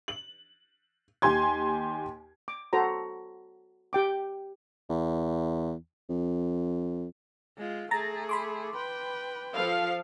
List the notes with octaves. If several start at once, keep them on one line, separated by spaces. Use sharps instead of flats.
F#7
D#2 G4 G#5 C6 G#6
D6
F#4 A4 C5 A#5
G4 G5 D6
E2
F2
G#3 F4
A3 G#4 A#5 A6 A#6
B5 C6 D6
B4 G5
F3 A4 F5